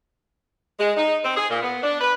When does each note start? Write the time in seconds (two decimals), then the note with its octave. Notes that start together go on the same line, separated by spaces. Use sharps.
0.79 G#3
0.97 D#4
1.24 C4
1.35 G#4
1.49 A#2
1.62 B3
1.82 D4
2.01 B4